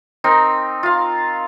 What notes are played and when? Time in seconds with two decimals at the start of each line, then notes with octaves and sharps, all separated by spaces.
0.24 C4 D#4 A#4
0.83 F4 F5